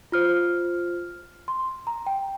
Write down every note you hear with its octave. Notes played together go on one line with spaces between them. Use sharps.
F4 C5 F6
C6
A#5
G5